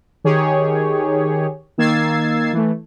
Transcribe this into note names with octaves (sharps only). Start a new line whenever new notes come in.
D#3 G4 G#4 C#5
D#3 A#3 E6 G#6 A6 C7
E3 A3